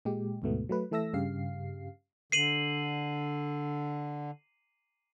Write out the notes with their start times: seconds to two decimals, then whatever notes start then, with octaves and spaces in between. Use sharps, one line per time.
0.05 A#2 G#3 G4
0.42 D2 G#2 B2 A3 B3
0.69 F#3 A3 B4
0.91 E3 A3 A4 E5 E6 A#6
1.14 G2 C#3 G4 F5 C7
2.32 D3 C7 D#7 F#7